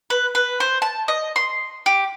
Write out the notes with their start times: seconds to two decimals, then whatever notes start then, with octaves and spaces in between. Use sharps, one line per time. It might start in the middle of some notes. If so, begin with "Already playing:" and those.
0.10 B4
0.35 B4
0.60 C5
0.82 A5
1.08 D#5
1.36 C6
1.86 G4